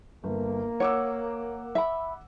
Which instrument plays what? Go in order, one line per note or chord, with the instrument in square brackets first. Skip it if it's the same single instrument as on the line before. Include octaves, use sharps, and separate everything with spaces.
[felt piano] G1 [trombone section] A#3
[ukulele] C#5 [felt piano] F#5 D6 E6
[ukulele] E5 B5